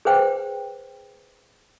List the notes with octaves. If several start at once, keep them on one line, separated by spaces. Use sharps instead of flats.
G#4 B4 C5 F#5 G5